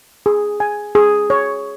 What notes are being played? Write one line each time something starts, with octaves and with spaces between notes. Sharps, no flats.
G#4
G#5
G#4
C#5